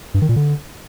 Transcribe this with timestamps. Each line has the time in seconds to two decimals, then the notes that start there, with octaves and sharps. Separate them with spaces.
0.14 G2
0.22 D#3
0.29 A#2
0.36 D3